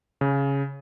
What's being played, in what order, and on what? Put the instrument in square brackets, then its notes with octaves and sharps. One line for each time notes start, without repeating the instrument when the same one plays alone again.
[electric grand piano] C#3